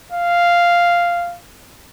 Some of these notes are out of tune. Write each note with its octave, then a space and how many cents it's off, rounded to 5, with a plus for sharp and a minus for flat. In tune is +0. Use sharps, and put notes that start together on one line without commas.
F5 -5